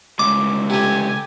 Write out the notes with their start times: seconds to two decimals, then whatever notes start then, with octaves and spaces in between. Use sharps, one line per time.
0.19 C#3 G3 G#3 D6
0.70 C3 A3 G4 G#5